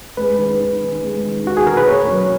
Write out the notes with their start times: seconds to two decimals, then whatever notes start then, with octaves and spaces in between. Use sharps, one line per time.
0.17 G#3 B4
0.38 D#3
0.60 D#4
0.80 D#3
1.02 G#3
1.24 D#3
1.44 D#4 F#4
1.57 G#4
1.65 D#3 A#4
1.77 B4
1.87 A#3 C#5
2.08 F#3